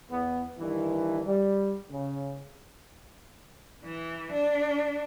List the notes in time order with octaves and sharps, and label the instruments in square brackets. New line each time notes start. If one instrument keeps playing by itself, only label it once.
[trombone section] E2 B3
G2 D#3 E3
G3
C#3
[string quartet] E3
D4